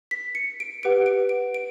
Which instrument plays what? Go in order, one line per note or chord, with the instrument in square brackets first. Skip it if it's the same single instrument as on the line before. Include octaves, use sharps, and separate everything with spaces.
[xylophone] B6
C#7
D7
G4 B4 F#5 D7
D7
D7
D7